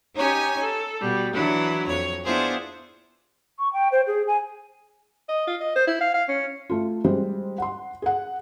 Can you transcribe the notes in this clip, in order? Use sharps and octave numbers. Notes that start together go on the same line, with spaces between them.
C#4 D#4 G4 C#5 G#5
A4
B2 G3
E3 F#3 D4 E4
F2 C#5
B3 D4 E4 F4 G#4 C5
C#6
G5
C5
G#4
G#5
D#5
F4
D#5
C5
E4
F5
F5
C#4
A3 F4
G3 G#3 C5
F#5 C6
G#4 F#5